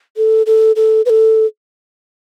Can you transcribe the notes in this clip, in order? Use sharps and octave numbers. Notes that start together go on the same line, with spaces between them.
A4
A4
A4
B4
A4